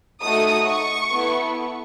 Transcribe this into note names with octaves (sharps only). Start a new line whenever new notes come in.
A3 D#4 F#4 A4 D#6
C#6
B3 E4 A4